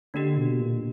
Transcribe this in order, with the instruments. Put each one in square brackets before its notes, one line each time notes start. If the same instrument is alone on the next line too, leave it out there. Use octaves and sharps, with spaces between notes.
[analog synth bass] D3 [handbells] A#3 D4 G4
[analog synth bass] B2
A#2